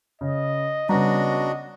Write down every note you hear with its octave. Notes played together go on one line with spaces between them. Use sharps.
C#3 D#5
C#3 G3 B3 D4 F#4 D#5 A#5